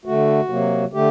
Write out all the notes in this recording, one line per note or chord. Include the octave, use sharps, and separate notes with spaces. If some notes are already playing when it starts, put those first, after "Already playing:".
D3 A3 F#4
C3 F#3 A#3
D3 A3 G4